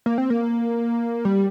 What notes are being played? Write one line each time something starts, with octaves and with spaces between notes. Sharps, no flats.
A#3
C4
A#3
G3